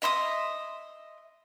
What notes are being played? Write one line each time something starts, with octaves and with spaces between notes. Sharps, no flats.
D#5 E5 C6 D#6